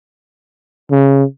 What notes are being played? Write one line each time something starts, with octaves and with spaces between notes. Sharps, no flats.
C#3